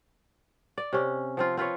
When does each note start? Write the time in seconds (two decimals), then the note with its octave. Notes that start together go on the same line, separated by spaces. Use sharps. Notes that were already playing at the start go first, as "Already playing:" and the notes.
0.78 D5
0.93 C3 C#4
1.37 F3 C4 F4
1.57 C4 F4 B4 C#5